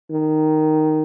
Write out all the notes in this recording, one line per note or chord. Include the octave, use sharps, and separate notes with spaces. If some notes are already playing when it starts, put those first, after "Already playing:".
D#3